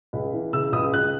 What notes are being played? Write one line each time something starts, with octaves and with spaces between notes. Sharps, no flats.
C#2
E3
C#3 E6
C#2 D#6
C#2 F#6